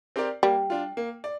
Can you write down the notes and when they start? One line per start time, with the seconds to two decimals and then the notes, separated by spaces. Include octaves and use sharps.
0.16 C4 G4 A#4 D5
0.43 G3 A#3
0.70 D4 F4
0.97 A#3
1.24 D5